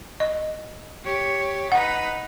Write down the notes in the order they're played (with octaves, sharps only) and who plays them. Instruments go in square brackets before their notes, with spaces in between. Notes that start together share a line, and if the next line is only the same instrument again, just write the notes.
[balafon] D#5
[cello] G4 C#5
[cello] D#4 B4 [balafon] F#5